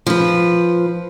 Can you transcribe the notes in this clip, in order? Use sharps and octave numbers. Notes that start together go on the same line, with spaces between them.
F3 B4